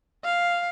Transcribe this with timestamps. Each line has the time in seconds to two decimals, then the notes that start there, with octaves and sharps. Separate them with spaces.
0.24 F5